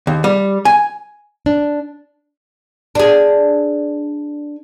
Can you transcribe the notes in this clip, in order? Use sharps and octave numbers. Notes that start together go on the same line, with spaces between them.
D#2
G3
G#5
D4
D4 G#4